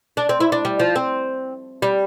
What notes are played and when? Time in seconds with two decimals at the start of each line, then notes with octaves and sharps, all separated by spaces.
0.17 D4
0.29 C4
0.40 E4
0.52 D4
0.65 G3
0.79 F3
0.96 C4
1.82 G3